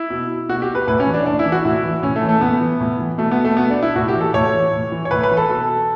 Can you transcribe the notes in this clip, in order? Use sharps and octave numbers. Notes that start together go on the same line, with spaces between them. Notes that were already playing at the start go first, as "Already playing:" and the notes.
Already playing: E4
B2
B2 F#4
G4
B4
A2 B4
C#4
E3
D4
A2 D4
E4
E3
F#4
A2 E4
E3
A2 C#4
A3
E3
A3
A2 B3
E3
A2
E3
B2 A3
B3
A3
B2 B3
D4
E4
A2 F#4
G4
E3
A4
A2 C#5
E3
A2
E3
C#5
A2 B4
B4
E3
A4
B2 A4